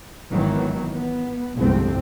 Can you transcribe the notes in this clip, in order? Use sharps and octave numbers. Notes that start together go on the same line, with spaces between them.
G#1 D#3 E3 F#3 B3
B3
G1 C2 F2 G#3 A3 C4